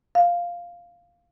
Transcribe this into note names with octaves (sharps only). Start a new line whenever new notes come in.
F5